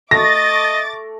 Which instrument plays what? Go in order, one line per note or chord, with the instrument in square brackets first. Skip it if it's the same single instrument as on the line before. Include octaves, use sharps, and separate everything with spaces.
[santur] A3 C#6 [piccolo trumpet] D#5 [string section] D6 A6 [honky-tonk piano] A#6